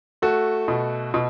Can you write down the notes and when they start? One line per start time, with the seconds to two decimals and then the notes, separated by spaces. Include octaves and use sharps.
0.22 A3 F#4 A4
0.68 B2
1.14 B2